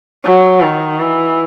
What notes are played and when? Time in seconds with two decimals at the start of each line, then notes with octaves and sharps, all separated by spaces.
0.24 F#3
0.61 D#3
0.99 E3